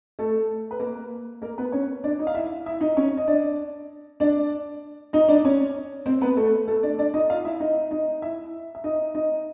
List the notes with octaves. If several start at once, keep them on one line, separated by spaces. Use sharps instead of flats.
A3 A4
B4
A#3 A#4
A#3 A#4
B3 B4
C#4 C#5
D4 D5
D#4 D#5
F5
E4 E5
E4 E5
D#4 D#5
C#4 C#5
D#5
D4 D5
D4 D5
D#4 D#5
D4 D5
C#4 C#5
C4 C5
B3 B4
A3 A4
A3 A4
D4 D5
D4 D5
D#4 D#5
F4 F5
E4 E5
D#4 D#5
D#4 D#5
E4 E5
E5
D#4 D#5
D#4 D#5